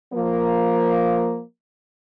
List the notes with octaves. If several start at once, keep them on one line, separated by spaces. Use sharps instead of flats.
F3 A#3